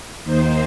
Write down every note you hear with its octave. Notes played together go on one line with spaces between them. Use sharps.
D#2 D#3 A#3 D#4 C5